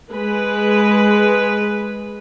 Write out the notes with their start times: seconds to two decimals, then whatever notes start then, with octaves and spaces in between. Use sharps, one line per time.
0.12 G#3 B4